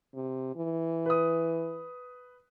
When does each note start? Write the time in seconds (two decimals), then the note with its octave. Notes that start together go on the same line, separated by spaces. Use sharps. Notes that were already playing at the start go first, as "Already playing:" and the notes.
0.14 C3
0.55 E3
1.06 B4 D#6